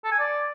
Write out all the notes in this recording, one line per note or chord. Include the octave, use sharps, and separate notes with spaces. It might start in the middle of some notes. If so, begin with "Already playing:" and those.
A4
G#5
D5